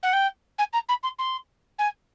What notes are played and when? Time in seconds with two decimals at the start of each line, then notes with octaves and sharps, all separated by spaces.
0.03 F#5
0.13 G5
0.58 G#5
0.73 A#5
0.88 B5
1.03 C6
1.18 C6
1.78 G#5